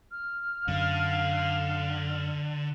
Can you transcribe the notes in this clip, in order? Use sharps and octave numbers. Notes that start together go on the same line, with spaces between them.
F6
F#2 D3 F5